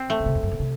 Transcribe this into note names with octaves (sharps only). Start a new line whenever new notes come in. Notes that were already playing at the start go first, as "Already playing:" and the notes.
Already playing: C4
A3
C#3
C3
F2
F#2
A#2
C3